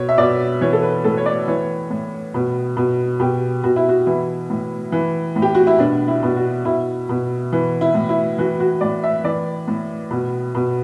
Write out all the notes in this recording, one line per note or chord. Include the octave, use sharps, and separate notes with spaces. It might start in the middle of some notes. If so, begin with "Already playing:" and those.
Already playing: B2 C#5
E5
B2 D5
E3 C#5
A4
B4
A2 A4
C#5
D5
E3 C#5
A2
B2
B2
B2 G4
B2 F#4
E4
F#4
E3 E4
A2
E3
A2
G4
F#4
E4
B2 D4
E4
B2
F#4
B2 E4
B2
E3
E4
A2
E4
E3 F#4
F#4
A2 D5
E5
E3 D5
A2
B2
B2